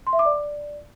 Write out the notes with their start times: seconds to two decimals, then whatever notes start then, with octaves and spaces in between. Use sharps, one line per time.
0.07 C6
0.13 E5
0.19 D6
0.25 D5